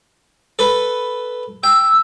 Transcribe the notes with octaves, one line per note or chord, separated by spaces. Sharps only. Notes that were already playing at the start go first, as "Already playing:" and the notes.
A4 B4
G5 E6